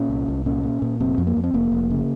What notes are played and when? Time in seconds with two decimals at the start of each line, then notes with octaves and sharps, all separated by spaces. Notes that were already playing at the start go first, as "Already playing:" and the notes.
Already playing: A#2 C#4
0.09 C2
0.28 C2
0.46 A#2 C#4
0.63 A#2
0.82 A#2
1.00 F1 C4
1.18 F2
1.27 A#3
1.37 F2
1.44 C4
1.54 F1 A#3
1.72 F1
1.90 C#3